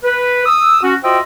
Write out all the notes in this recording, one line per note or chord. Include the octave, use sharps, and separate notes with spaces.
B4
D#6 E6
C#4 F#4
F4 F#4 C5 D#5 E5 G5